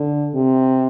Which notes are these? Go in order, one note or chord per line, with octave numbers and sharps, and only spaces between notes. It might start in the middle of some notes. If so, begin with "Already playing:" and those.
Already playing: D3
C3